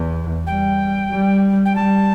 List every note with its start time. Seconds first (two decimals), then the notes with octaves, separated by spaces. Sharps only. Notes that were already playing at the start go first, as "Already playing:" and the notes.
Already playing: E2
0.47 G3 G5
1.12 G3
1.65 G5
1.76 G3 A5